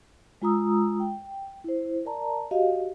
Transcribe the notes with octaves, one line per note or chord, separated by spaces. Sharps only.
G#3 F4 A#5 D#6 E6
G5
E4 C5
A#4 D5 A5 A#5
F#4 G4 D#5 F5